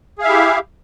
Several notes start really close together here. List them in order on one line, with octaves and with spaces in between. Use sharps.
G#4 F5 E5 E4 G4